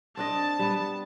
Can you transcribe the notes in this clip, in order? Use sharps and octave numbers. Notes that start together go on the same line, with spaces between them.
C4 D4 D#5 A5
G3 B3